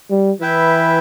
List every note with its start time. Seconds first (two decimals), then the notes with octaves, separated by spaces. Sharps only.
0.10 G3
0.41 E3 E4 B4 E5 G5